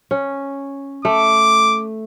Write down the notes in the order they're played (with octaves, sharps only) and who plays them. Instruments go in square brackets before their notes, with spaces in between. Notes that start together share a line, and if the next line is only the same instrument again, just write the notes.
[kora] C#4
[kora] A3 [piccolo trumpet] D6